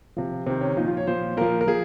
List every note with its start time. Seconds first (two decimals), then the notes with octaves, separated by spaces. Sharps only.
0.17 C3 F3
0.46 C3 D#3 C4
0.61 C#4
0.77 A#2 F3 D#4
0.87 F4
0.97 C#5
1.07 A#2 F3 C5
1.37 A#2 F3 A#4
1.61 A#4
1.67 F3 G#4